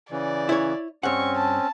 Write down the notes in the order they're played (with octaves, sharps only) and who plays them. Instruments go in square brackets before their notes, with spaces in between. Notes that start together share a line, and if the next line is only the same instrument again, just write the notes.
[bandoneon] C#3 E3 [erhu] D5
[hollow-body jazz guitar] E4 C#5
[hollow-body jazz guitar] G2 F#5 [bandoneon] C4 C#4 [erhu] C#6
[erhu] A5